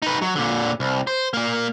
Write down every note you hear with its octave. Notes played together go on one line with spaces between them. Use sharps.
D#4 B4
F#3
A#2 D3
C2
C5
A#2 A#3